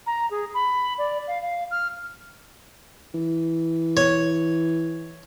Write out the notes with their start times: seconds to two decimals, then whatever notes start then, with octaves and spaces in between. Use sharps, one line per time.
0.06 A#5
0.30 G#4
0.54 B5
0.98 D5
1.27 F5
1.42 F5
1.71 F6
3.14 E3
3.97 C#5